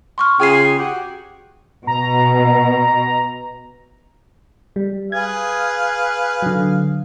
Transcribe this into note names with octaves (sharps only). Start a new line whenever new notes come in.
C6 C#6 F6
C#3 F4 G#4 G5 G#6 C7
F#4 G4
B2 A#5
G3
G#4 B4 F5 G#6
D3 F#3